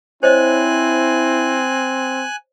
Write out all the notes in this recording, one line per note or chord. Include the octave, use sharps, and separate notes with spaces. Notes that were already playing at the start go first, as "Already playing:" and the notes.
C4 E4 C5 C#5 D#5 G#5 F#6